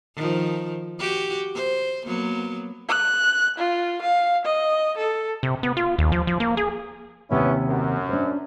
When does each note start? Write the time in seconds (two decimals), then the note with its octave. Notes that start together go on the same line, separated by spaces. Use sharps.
0.16 D#3 F3
0.99 F#4 G4
1.55 C5
2.06 F#3 A#3 B3
2.88 F#6
3.57 F4
4.01 F5
4.45 D#5
4.97 A4
5.43 C3
5.63 B3
5.77 F4
5.99 D#2
6.12 F3
6.27 F3
6.40 A#3
6.57 G#4
7.30 D#2 C3 B3 C#4 E4 G5
7.67 F#2
8.09 D4 C5